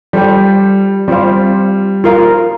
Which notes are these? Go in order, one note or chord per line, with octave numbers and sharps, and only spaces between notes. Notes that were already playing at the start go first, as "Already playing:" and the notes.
G3 F4 A4 C5 G5
G3 C4 F4 C5 F5
F4 A#4 F5